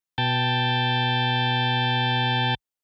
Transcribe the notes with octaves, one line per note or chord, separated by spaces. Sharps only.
B2 G5 A5